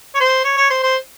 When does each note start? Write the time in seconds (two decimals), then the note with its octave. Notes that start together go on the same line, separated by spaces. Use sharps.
0.15 C#5
0.20 C5
0.45 C#5
0.57 C#5
0.70 C5
0.83 C5